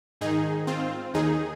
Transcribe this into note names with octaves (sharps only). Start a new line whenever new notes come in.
G#2 D#3 D#4 G#4
C4 F4
D#2 D#3 D#4 G#4